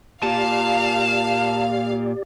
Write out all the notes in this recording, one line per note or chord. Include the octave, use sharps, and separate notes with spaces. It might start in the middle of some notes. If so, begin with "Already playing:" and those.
A#2 G4 D5 F5 A5